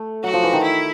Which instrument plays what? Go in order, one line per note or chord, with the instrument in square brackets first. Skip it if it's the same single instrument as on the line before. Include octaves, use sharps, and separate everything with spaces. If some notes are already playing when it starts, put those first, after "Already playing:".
Already playing: [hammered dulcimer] A3
[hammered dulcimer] F#3 [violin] F#4
[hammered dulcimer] F3
E3
D#3
[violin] E4